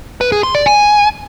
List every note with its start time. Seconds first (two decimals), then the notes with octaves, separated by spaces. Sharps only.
0.21 B4
0.32 G#4
0.43 C6
0.55 D5
0.66 G#5